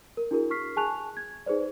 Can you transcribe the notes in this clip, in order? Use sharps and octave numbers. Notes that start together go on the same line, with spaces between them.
A#4
D4 E4 F#4 G#4 A#4
C#6 F6 B6 C7
G#4 G#5 A5 C#6 F#6 F7
G#6
D#4 G#4 B4 C5 D5